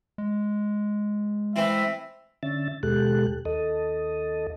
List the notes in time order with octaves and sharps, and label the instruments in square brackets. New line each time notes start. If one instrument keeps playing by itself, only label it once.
[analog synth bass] G#3
[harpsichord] E3 C4 [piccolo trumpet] E5
[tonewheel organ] D3 C#4 E5 A6
D#2 B2 G#3 G4 A4 F#6
D#2 A4 D#5